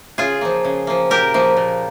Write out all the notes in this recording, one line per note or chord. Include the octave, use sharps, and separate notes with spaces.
C#3 F4 G#4
F3 A#3
C#3
F3 A#3
A#2 G4 A#4
F3 A#3
A#2